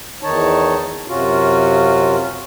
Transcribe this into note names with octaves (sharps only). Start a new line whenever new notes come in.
E2 D#3 D#4 C#5 A5
F#2 C3 C#4 F4 F#4